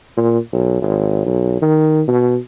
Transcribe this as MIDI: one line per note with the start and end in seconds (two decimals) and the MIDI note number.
0.17 0.39 46
0.52 0.80 35
0.82 1.26 32
1.26 1.61 35
1.62 2.02 51
2.08 2.38 47